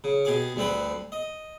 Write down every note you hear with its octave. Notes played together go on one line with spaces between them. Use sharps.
C#3
B2 G4 G#4 D6
D2 G3 C4 B4
D#5